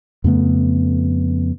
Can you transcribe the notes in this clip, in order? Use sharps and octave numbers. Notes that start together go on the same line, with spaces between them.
F2 C#3 A3 B3